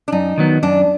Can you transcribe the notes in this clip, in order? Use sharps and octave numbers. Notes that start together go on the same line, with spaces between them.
D4
F#2 D#4
D#3 F#3 B3
F#2 D4